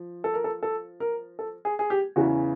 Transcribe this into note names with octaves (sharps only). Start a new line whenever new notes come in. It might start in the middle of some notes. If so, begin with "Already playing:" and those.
Already playing: F3
A4
A#4
A4
A4
A#4
A4
G#4
G#4
G4
E2 C#3 E3 F#4